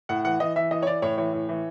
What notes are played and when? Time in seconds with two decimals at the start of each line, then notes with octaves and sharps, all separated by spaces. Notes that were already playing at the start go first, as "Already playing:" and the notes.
0.09 A2 F#5
0.25 E3 F#5
0.40 E3 D#5
0.56 E3 E5
0.71 E3 D#5
0.83 C#5
0.87 E3 D5
1.02 A2 C#5
1.18 E3 C#5
1.33 A2
1.49 E3